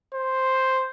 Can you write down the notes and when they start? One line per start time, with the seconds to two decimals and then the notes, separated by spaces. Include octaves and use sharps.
0.14 C5